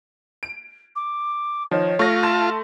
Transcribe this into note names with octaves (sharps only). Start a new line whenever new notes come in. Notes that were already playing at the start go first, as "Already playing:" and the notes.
D7
D6
D#3 F3 C#5
A3 F4 C#6 A#6
A5 C6